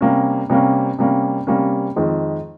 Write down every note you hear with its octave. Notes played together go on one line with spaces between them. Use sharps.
C3 G3 A#3 C#4
C3 G3 A#3 C#4
C3 G3 A#3 C#4
C3 G3 A#3 C#4
F2 D#3 G#3